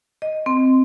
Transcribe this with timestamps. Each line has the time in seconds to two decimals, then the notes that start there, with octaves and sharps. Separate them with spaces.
0.22 D#5
0.46 C4